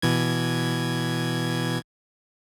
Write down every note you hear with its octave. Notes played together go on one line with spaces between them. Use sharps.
B2 E3 G#6